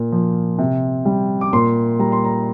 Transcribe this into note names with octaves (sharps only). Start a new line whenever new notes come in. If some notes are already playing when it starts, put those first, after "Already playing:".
Already playing: A#2
F3
C3
G3
D6
A#2 C6
G3 A#5
C6
A#5